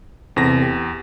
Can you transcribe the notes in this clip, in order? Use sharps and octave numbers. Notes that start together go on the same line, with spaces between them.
E2 C3 C4 A4 A#6
G4